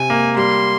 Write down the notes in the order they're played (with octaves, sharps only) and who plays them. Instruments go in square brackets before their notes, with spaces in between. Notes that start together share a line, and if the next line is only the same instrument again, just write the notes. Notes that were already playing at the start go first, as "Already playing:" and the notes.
Already playing: [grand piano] C3 [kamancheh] G#5
[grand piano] A#3
[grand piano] G3 [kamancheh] C6